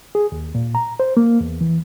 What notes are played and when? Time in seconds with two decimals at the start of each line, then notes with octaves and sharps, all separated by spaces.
0.15 G#4
0.32 D#2
0.55 A#2
0.75 A#5
1.00 C5
1.17 A#3
1.41 E2
1.61 E3